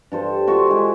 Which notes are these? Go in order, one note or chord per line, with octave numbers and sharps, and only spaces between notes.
G2 A4 C5
F4 F#4 E5
G#3 E4